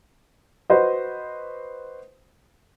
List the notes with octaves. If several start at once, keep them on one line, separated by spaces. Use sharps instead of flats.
F#4 B4 C5 D#5